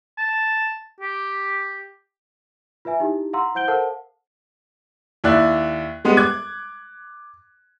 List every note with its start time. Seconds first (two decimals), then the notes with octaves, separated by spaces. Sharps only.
0.18 A5
1.01 G4
2.85 F4 B4 E5 G#5
3.00 D#4 E4 G4
3.33 F5 F#5 A#5 C6 E6
3.55 E4 C5 F#5 G6 D7 G7
3.68 A4 A#4 C5 F5 F#5 A5
5.24 D#2 E4 D5 F#6
6.05 G3 G#3 B3
6.17 D6 F#6 G#6